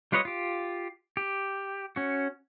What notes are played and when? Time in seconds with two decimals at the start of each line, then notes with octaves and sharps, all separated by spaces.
0.12 G3 F4 B4 C#5 D#5
0.25 F4 G4
1.17 G4
1.96 C#4 F#4